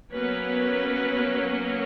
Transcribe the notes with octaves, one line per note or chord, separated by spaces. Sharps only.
F#3 A#3 B3 C#4 B4